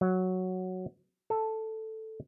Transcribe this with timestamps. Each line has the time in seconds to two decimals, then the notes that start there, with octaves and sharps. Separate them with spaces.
0.01 F#3
1.30 A4